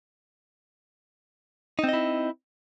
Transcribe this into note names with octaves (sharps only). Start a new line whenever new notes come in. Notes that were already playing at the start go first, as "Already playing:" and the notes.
C4 D#4 E4 D#5